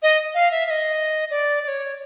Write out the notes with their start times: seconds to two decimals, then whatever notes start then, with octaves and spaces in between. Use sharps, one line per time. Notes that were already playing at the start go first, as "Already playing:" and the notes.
0.02 D#5
0.34 F5
0.51 E5
0.67 E5
0.70 D#5
1.30 D5
1.63 D5
1.68 C#5